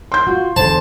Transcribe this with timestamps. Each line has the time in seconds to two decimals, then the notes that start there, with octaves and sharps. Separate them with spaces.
0.12 C6 G6
0.27 F4 F#4
0.56 E2 D3 C5 A5